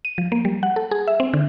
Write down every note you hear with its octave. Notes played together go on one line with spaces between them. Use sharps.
D#7
F3
A#3
G3
F#5
A4
G#4
E5
C4
D3